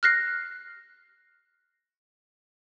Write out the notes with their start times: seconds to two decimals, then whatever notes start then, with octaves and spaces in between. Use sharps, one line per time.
0.03 F6 F#6 A#6 C7